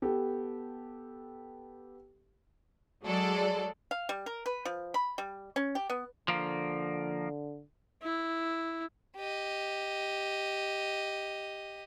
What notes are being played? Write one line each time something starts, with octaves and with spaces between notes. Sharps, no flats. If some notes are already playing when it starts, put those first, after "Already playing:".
B3 G4 A4
F#3 G#3 A4 D5
F5
G3
A#4
B4
F3
B5
G3
C#4
G4
B3
D3 F3 A#3
E4
G4 D#5